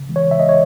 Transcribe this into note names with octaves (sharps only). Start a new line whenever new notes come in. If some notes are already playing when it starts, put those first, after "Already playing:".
Already playing: C#3
E3 G#3
C#5
C#3 E5
D#5
C#5